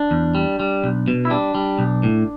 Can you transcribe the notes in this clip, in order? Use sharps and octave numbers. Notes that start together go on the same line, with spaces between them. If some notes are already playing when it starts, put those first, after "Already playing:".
Already playing: D4
E2
G3
G3
B1
B2
E4
G3 D4
G3
B1
A2